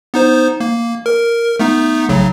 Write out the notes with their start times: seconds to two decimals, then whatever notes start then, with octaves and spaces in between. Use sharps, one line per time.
0.14 B3 D#4 C5
0.60 A#3
1.06 A#4
1.60 A3 B3 D#4
2.09 B1 C#3 F#3